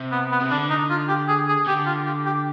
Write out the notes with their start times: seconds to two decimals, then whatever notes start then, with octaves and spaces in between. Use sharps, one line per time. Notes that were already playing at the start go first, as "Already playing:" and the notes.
Already playing: C3
0.12 B3
0.32 B3
0.41 C3
0.50 D3 D4
0.70 D#4
0.90 F4
1.08 G4
1.28 G#4
1.48 G#4
1.67 D3 G4
1.86 F4
2.06 G4
2.26 G4